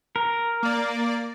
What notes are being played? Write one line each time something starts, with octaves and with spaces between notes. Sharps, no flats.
A#4
A#3 D5